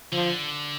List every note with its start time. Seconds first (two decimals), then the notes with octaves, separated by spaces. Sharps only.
0.12 D3 F3